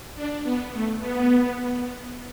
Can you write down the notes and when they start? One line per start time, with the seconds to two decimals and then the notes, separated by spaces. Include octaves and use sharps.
0.15 D4
0.43 B3
0.72 A3
1.00 B3